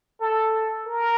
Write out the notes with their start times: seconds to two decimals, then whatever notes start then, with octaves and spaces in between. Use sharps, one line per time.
0.20 A4
0.86 A#4